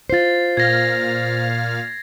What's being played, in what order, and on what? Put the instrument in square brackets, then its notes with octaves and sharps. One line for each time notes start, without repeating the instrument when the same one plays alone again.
[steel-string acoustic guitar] F4 C5 [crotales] A6 C7
[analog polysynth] A#2 F5 F6 [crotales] G#6 A#6